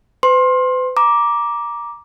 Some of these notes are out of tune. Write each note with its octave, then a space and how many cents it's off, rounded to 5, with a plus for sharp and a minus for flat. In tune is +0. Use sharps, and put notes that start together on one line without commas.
B4 +45 C6 +25
A#5 +20 D6 +0